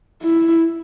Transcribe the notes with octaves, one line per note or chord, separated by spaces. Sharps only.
E4